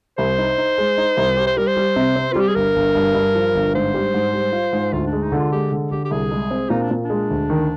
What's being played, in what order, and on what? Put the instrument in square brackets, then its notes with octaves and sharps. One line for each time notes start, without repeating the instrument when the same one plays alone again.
[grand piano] C2 [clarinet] C5
[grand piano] D#4
D#4
G#3
D#4
C2
G4
[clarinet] C5
[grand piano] G3 [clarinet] A#4
[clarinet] C5
[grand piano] G3
C3
C4
[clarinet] F4
[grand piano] G3 [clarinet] G4
[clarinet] G#4
[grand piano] G1 [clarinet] A#4
[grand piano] G1
G2
G2
F3
G1
[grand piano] G#2 [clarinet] C5
[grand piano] G3
G#2
G3
F4
G#2
[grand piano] D2 [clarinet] F4
[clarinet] D4
[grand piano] G#3
[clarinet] D#4
[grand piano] D3
[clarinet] F4
[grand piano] G#3 [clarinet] G4
[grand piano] D3
[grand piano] D3 [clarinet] G4
[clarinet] G4
[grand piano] C2 [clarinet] G#4
[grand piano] G#3
C4
[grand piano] A#2 [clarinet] D#4
[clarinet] D4
[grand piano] A#2
[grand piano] G#3 [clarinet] D4
[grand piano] D2
D#3